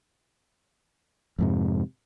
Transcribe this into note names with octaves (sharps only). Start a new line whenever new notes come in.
F2 G#2 C3